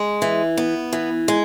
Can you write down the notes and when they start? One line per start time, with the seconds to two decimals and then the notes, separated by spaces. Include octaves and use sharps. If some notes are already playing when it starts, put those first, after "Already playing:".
Already playing: G#3
0.22 E3
0.57 B3
0.93 E3
1.28 G#3